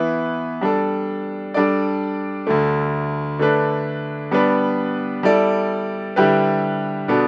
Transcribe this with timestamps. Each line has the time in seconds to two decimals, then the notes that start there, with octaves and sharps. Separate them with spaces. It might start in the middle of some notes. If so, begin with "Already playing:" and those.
Already playing: E3 B3 E4 B4
0.61 G3 D4 A4
1.54 G3 D4 A4 D5
2.47 D2 D3 A3
3.39 D3 A3 D4 B4
4.31 G3 B3 D4 B4
5.23 G3 E4 A4 D5
6.16 D3 G3 E4 G4 B4
7.08 B2 B3 D4 A4